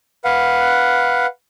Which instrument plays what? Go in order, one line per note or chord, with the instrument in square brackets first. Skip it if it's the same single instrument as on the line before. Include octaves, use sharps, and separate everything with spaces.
[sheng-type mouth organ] B4 F5 F#5